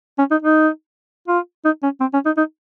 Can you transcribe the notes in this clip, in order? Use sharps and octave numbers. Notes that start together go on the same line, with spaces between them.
C#4
D#4
D#4
F4
D#4
C#4
C4
C#4
D#4
D#4